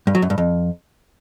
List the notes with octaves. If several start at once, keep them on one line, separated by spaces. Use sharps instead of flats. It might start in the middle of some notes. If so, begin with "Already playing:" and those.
G2
F#3
F#2
G2
F2